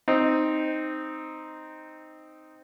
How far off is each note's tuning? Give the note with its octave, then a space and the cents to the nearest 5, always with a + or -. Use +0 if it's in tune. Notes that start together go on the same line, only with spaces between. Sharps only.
C4 +0 D#4 +0